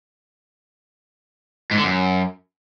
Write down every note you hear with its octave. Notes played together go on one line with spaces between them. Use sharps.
G#2
D3
F#2